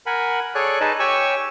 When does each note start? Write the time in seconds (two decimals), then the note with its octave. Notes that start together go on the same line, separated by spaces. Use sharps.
0.06 A#4 F#5 G#5 B5
0.55 G#4 A4 C#5 D5 G#5 F#6
0.80 D#4 G#4 B4 D#5 A5
0.99 G4 C#5 G#5 C#6 E6